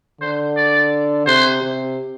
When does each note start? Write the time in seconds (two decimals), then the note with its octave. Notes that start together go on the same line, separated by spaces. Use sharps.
0.21 D3 C5
0.56 D5
1.27 C3 C5
1.62 C3